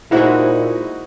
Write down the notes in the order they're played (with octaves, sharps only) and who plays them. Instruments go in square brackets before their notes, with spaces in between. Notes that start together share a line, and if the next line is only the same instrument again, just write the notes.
[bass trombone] A#2 [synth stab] G#3 E4 [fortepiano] D#4 F#4 [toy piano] G#4 C5 E5